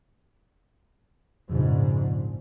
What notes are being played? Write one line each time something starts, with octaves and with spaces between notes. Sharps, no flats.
A#1 F2 G#2 C#3